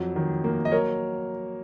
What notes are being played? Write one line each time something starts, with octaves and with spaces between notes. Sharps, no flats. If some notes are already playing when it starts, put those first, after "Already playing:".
Already playing: F2 F#3
D#3
A#3
D#5
F#3 A#4 C#5